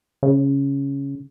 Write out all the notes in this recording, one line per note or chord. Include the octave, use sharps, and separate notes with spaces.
C#3